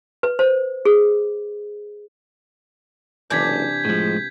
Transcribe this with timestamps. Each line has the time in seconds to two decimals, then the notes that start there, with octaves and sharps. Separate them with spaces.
0.23 B4
0.39 C5
0.85 G#4
3.30 F#1 C3 E3 D4 G6 G#6 B6
3.85 A2 F3 G#3